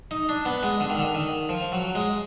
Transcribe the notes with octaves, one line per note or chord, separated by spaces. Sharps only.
D#4
D4
B3
G#3
D3
D#3
D3
D#3
F3
F#3
G#3